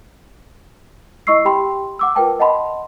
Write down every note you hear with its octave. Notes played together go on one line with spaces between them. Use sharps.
E4 D#5 C#6 E6 C7
G4 G5 B5 C6
F#5 D6 E6
F4 A#4 B4 G5 A5
D#5 F#5 A5 B5 C6